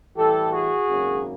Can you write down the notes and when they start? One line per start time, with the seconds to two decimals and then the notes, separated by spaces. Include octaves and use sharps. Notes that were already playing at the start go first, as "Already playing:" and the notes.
0.16 A2 E3 G3 G4 A4
0.52 F#4 G#4
0.87 G#1 F#2 C#3 F#3 A#3